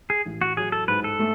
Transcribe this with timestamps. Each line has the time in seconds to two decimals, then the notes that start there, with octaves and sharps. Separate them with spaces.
0.10 G#4
0.26 A1
0.41 F#4
0.57 F#3 G#4
0.72 A4
0.88 G#2 B4
1.04 A4
1.19 A3